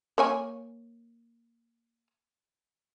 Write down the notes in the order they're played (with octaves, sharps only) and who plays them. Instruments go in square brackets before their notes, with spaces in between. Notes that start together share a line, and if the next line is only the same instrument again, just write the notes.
[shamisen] A#3 C#5 G#5